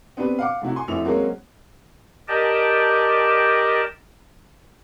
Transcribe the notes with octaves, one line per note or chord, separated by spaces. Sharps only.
B3 C4 D4 G4 B4
F5 F#5 D6
A2 C3 E4 F#4
F#5 G#5 C6
A1 F2 E3 E5 F7
F#3 G#3 A#3 C4 C#4 F#4
G4 A#4 D5 D#5 G5 A5